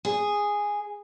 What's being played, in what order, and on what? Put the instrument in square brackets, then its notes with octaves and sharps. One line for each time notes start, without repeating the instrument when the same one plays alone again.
[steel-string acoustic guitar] G#4